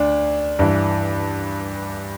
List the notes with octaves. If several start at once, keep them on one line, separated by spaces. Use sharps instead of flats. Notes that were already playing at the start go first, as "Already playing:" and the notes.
Already playing: D2 D4
G2 E3 D4